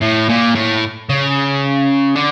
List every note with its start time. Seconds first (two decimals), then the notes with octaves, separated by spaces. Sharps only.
0.02 A2
0.29 A#2
0.55 A2
1.09 C#3
2.16 D3